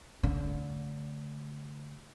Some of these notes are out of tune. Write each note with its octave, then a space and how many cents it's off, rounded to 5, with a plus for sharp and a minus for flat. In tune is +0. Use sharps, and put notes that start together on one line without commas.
D3 -30 A3 +0